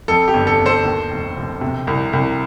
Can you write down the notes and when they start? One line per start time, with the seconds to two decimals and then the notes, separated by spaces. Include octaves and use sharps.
0.08 F2 A4
0.28 G4
0.34 G1
0.47 A4
0.60 G1
0.66 A4 C5
0.85 D#2
1.11 F1
1.37 F1
1.61 C3
1.87 C2
2.13 C2